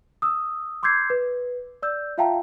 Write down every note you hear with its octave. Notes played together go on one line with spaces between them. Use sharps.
D#6 E6
C6 D6 E6 G6 G#6 C7
B4
D5 E6 G6
F4 E5 F5 G5 A5 A#5